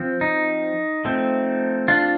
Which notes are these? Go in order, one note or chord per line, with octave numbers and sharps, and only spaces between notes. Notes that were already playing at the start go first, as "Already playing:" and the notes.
Already playing: F3 C4
D#4
F3 A3 C4
D4 F4